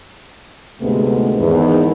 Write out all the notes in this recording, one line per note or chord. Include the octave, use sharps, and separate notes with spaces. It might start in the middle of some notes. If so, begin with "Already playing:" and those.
D2 G#2 C3 G#3 A3 B3
E2 G#2 D#3